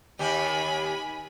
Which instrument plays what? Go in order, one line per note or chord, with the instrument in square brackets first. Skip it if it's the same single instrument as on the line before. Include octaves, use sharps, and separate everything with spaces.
[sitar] D#2 G4 [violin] G#5 B5